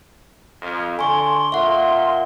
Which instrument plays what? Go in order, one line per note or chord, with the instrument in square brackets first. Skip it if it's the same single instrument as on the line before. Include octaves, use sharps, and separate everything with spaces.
[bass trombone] F2
[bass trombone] D3 [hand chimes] G#5 C#6 [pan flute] C6
[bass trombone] A#2 [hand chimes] E5 F#5